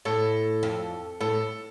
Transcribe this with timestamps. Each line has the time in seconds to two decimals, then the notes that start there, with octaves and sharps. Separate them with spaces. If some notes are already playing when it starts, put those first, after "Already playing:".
0.05 A2 A4
0.63 F2
1.21 A2 A4